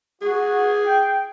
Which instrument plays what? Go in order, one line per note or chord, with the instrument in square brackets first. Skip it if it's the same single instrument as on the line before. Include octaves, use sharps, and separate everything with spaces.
[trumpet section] F#4 [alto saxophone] G#4
[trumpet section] G5